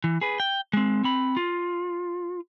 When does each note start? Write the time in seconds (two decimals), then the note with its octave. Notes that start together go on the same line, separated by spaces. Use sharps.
0.04 E3
0.21 G#4 B4
0.40 G5
0.73 G#3 C4
1.04 C4 B5
1.37 F4